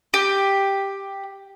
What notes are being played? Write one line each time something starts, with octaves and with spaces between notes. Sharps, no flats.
G4